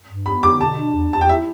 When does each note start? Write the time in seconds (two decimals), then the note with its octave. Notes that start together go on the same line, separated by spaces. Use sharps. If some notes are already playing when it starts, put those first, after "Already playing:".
0.08 G2
0.26 B3 B5
0.43 D3 D6
0.61 B2 A5
0.77 D4
0.94 E2
1.12 E2 A5
1.21 G5
1.28 E4 E5